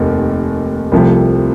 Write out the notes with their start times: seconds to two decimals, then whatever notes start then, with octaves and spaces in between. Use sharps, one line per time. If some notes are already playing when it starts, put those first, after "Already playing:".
Already playing: F1 D#2
0.92 C2 C3 F3 A3